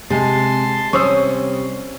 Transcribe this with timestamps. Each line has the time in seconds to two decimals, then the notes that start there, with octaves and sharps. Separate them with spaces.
0.10 C3 G#3 G#5 A5 C6
0.93 C3 G3 C#4 C5 C#6 D#6 E6